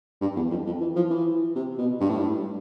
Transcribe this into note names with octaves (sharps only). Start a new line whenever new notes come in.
G2
E2
F2
F2
E3
F3
E3
C3
B2
G2
A2
G2